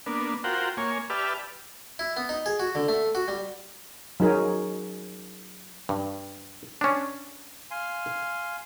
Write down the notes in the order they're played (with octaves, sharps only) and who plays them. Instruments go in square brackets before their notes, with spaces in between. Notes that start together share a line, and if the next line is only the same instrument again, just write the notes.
[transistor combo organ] A#3 B3 D4
F4 F#4 A#4 C5 F#5 G5
A#3 C#5 G#5
G4 B4 D5 E5 A5 F6
[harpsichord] E4
B3
D#4
G#4
F#4
D3
A3
F#4
G3
[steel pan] F#3 D#4 G#4 A#4
[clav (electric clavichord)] G2
C#4 D4
[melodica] F5 G#5 C6